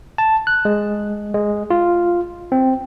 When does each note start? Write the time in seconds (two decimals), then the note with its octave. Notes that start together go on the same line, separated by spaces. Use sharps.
0.18 A5
0.47 F#6
0.65 G#3
1.34 G#3
1.70 F4
2.52 C4